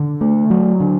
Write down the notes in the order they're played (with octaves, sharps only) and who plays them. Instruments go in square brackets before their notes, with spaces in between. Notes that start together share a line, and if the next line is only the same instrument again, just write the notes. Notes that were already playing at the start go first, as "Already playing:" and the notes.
Already playing: [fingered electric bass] D3
A3
F#3
D3